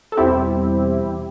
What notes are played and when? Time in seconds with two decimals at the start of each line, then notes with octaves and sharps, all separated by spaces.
0.12 A4
0.17 E2 B2 G3 C4 E4 G4